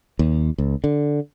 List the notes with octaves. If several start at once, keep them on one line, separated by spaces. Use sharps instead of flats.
D#2
C#2
D3